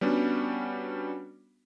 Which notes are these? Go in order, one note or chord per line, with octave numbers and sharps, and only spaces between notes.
G3 B3 C#4 D4 F#4